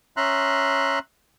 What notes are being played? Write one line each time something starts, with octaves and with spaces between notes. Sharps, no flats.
C#4 E5 A#5 C6 F#6